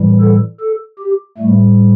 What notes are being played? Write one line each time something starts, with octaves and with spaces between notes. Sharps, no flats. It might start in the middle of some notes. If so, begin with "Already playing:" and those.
Already playing: A2 E3 G3
A4
A4
G4
A2 G3 A3